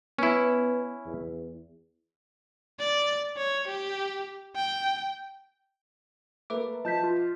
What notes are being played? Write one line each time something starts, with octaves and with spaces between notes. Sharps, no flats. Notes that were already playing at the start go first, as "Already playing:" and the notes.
B3 C#4 E4
E2
D5
C#5
G4
G5
A3 A#3 B4 E5 D6
F3 D#5 A5 G6 B6
F4